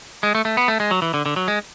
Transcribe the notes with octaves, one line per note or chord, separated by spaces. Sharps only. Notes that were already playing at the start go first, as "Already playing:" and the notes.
G#3
A3
A3
B3
A3
G#3
F#3
E3
D3
D3
F#3
G#3